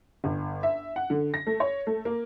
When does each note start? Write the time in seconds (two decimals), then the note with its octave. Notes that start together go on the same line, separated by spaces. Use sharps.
0.24 G1
0.63 E5
0.96 F#5
1.10 D3
1.34 A#6
1.47 A3
1.60 C#5
1.87 A3
2.05 A#3